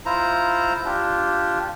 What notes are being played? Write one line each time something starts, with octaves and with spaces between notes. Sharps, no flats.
E4 F4 C5 A#5
D4 F4 G4